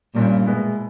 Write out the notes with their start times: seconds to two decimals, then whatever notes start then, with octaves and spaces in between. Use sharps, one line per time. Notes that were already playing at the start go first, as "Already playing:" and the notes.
0.15 G1 G2 A#2 G3 C#4
0.46 B2 G#3 B3 E4